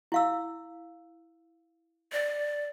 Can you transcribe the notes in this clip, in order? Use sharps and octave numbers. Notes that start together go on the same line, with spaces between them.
E4 F5 E6
D5